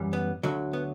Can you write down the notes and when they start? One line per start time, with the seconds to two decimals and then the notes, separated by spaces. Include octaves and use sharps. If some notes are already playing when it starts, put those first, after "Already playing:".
Already playing: F#2 E3 G3
0.13 B3
0.43 D2 D3 F#3
0.73 B3